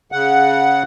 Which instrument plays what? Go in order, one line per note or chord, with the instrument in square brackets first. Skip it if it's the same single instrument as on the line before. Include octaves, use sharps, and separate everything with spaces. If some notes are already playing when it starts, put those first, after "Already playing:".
[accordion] C#3 F#5